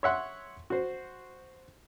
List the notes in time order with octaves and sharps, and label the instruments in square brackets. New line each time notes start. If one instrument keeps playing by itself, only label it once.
[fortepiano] C#5 E5 F#5 C6
F#4 C5